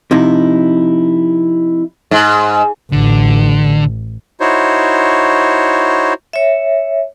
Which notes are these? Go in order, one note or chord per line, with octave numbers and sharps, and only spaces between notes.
C3 F3 D#4 E4
G#2
A1 D3
D#4 E4 F#4 C5 C#5
C#5 E5